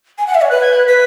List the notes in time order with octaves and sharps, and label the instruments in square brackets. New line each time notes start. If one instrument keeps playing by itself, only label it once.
[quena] G#5
F#5
E5
C#5
[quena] B4 [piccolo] F#6
[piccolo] G#6
F#6
[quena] B4 [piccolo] B6